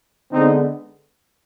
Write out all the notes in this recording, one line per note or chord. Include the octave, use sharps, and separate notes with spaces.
D3 G#3 B3 C4 D#4